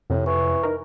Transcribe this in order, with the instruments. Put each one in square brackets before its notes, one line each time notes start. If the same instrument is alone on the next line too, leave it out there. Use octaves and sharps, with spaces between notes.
[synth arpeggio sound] F2 C3 [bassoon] A2
[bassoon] E3 [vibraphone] C#6
[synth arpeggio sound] D#4 A#4